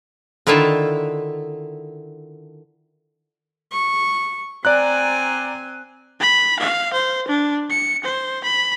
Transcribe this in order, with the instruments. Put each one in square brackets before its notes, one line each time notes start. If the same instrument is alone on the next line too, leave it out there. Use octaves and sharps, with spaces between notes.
[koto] D3 D#3 E4 F4 E5 A5
[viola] C#6
[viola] C4 G#5 [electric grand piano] D5 A#5 F#6
[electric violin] B5
F5
C5
D4
C#7
C5
B5